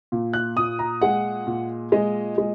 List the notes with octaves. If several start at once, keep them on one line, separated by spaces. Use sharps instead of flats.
A#2
F#6
A#2 D#6
A#5
G#3 F#5
A#2
G#3 D#5
G#3